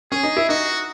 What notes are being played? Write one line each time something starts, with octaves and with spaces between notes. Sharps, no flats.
C#4 G#4
D#4
E4
D#4 F#4